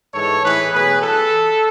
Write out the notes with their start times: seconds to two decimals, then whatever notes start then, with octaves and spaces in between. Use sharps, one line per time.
0.14 G#2 E3 A4 C#5
0.43 A2 E3 G#4 B4
0.72 B2 F#3 G#4 B4
1.00 E3 A4